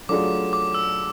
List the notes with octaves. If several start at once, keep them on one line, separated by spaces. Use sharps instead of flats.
F#3 A3 D4 F4 G#4 D6
D6
E6